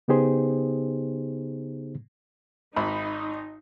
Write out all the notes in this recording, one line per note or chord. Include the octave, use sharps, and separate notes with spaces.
C#3 B3 D#4 G4 G#4 C5
G#1 D#4 B5